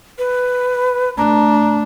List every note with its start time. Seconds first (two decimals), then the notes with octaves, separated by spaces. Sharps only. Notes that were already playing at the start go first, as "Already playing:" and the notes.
0.18 B4
1.18 A3 D4 A#5